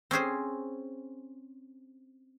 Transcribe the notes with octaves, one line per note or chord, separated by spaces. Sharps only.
C4 C#4 G#4 C5